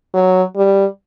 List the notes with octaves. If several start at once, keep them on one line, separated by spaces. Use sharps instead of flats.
F#3
G3